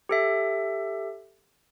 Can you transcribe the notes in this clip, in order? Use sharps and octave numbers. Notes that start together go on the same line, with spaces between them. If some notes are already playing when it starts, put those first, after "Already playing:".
G4 A4 E5